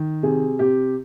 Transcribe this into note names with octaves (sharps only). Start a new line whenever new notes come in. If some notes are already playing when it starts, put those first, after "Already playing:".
Already playing: D#3
C3 G#4
C3 G4